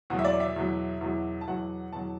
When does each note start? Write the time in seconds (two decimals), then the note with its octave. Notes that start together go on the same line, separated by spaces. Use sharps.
0.10 E2 B2 F#3 F#4
0.19 E5
0.25 D5
0.40 E5
0.56 E2 B2 F#3
1.01 E2 B2 F#3
1.41 A5
1.48 E2 B2 F#3 F#5
1.93 E2 B2 F#3 A5